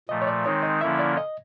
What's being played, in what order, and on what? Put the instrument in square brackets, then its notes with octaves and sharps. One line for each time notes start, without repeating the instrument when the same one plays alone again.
[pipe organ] A#2 F3 A3 [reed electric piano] D#5
[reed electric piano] C#5
D5
[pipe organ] D#3 G#3 C4 D#4 [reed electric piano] C#5
[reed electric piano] D#5
[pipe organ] D3 F3 A#3 C#4 E4 [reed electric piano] E5
[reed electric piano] D5
D#5